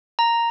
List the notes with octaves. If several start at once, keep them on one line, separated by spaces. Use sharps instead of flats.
A#5